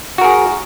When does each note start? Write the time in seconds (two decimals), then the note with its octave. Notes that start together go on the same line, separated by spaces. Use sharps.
0.18 F#4
0.21 A#4
0.24 G#4